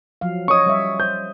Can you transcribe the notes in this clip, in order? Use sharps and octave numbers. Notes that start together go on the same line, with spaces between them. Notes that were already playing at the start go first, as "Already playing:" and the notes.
F3 F#3 F5
C#4 C#5 D#5 C#6 D#6
G3 C#5 E5
C5 G6